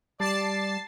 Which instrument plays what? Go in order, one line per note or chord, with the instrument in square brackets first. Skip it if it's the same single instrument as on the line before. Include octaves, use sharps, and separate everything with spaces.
[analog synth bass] G3 [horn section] D5 [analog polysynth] A5 A6 C7